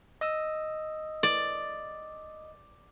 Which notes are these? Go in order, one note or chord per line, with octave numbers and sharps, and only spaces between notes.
D#5 D#6 E6
D5